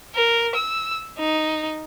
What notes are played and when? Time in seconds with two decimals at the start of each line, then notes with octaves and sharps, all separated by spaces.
0.15 A#4
0.55 E6
1.18 D#4